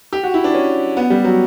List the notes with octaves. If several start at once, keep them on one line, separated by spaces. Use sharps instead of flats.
G4
F#4
E4
D4
C#4
B3
G3
F#3